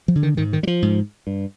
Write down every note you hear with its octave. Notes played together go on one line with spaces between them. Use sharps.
F3
D3
D#3
G#2 D#3
D#3
G3
F3
G#2
G2